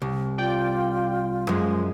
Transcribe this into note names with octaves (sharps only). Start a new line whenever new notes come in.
C2
F4 D5 G5
F#2 F3 G#3